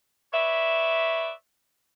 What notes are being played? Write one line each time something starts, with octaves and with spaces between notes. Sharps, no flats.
B4 C#5 D5 E5